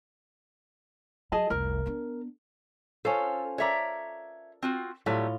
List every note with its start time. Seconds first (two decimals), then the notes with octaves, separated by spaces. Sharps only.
1.32 F#3 G#4 D#5 A5
1.50 F1 C2 A#4
1.86 B3 D4
3.05 C#4 F4 A4 C5
3.58 A4 A#4 C#5 D5 E5 A#5
4.62 C4 F4 F#4
5.06 A2 F#3 G3 A3 F4